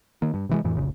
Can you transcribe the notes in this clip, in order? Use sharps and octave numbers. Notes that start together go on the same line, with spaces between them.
D#3 A#3
G2
C3 E3 G#3
F2 A2 E3
F1 A#1 C#3